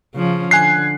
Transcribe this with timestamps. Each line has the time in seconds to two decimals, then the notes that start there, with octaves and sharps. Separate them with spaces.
0.15 C#3 F3 C#4
0.51 D3 G#5 F#6 C7